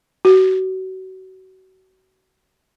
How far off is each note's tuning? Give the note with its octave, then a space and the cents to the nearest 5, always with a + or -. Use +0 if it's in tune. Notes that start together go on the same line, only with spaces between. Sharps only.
F#4 +30